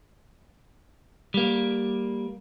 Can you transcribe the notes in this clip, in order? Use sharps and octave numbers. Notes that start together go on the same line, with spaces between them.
G3 A#3